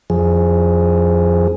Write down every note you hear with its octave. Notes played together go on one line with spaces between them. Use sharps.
F2 F3 G#4